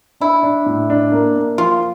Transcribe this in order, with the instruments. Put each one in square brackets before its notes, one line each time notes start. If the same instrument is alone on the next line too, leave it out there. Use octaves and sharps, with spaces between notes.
[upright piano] D4 [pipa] E4
[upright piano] D4
A2
D4
A#3
A#3
[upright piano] F3 [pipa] F4